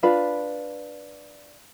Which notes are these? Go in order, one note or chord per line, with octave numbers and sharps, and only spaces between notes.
D4 F4 B4 F5